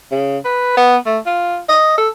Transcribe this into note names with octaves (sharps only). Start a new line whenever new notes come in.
C#3
B4
B3
A3
F4
D#5
A4